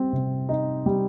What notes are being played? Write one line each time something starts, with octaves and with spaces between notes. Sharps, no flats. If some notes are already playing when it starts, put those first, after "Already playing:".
Already playing: G3 C4
C3
D#4
G3